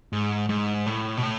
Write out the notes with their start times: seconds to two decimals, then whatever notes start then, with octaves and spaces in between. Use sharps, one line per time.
0.13 G#2
0.49 G#2
0.86 A2
1.17 B2
1.23 A2